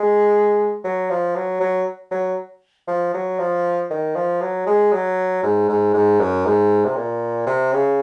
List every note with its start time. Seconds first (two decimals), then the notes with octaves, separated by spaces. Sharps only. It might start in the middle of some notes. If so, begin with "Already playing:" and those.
Already playing: G#3
0.84 F#3
1.10 F3
1.36 F#3
1.60 F#3
2.11 F#3
2.88 F3
3.14 F#3
3.39 F3
3.91 D#3
4.16 F3
4.42 F#3
4.67 G#3
4.93 F#3
5.43 G#2
5.69 G#2
5.94 G#2
6.20 F#2
6.46 G#2
6.85 C3
6.96 A#2
7.47 C3
7.73 C#3